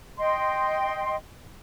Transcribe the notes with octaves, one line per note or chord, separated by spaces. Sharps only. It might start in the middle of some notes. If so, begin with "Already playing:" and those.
D#5 G5 C6